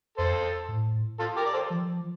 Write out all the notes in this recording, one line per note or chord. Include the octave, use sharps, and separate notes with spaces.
F2 A4 C5
A2
F4 A4
G4 A#4
D5
A4 C5
F3